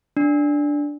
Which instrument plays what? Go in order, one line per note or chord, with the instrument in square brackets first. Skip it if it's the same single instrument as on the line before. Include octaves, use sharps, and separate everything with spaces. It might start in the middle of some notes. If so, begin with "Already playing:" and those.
[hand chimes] D4